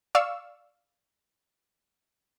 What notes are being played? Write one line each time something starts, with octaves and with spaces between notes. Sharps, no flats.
D5 F5 C#6 E6